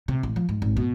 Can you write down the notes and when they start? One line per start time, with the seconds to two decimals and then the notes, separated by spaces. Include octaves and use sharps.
0.08 C3
0.23 A1
0.36 F3
0.49 G#2
0.62 G#1
0.77 B2